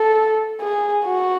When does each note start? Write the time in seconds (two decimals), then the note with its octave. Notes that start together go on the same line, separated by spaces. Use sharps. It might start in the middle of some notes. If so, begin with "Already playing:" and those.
Already playing: A4
0.61 G#4
1.06 F#4